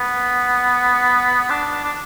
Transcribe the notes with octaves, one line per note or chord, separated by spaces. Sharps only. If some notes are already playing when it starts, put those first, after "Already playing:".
Already playing: B3
D4
D4